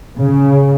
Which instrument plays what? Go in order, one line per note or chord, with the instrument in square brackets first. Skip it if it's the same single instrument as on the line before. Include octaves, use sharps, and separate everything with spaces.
[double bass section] C#3